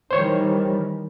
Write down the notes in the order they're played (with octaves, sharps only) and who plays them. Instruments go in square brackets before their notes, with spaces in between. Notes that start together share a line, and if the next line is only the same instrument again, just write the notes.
[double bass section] D#3 E3 G3 [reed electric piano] C5 C#5